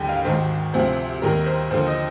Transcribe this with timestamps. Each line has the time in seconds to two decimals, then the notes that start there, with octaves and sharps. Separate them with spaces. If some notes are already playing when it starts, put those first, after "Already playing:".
Already playing: D#2 D3 G3 G5 G#5
0.09 F5
0.25 G#1 G#2 D#3 C5
0.74 D2 C3 F3 C5
1.22 D#2 D#3 G3 A#4
1.46 C5
1.71 D#2 D3 F3 C5
1.87 D#5